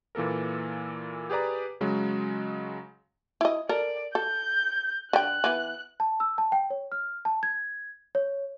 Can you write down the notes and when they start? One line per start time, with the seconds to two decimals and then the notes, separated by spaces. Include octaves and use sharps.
0.15 A#2 E3 A#3 A4 A#4
1.30 G4 G#4 B4 D5 A#5
1.81 C#3 F#3 G#3
3.41 E4 D#5
3.69 A4 A#4 D5
4.15 A4 G6
5.13 D3 G5 F#6
5.44 E3 B3
6.00 A5
6.20 E6
6.38 A5
6.52 G5
6.70 C#5
6.92 F6
7.25 A5
7.43 G#6
8.15 C#5